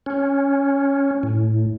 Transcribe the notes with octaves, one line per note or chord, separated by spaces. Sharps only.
C#4
A2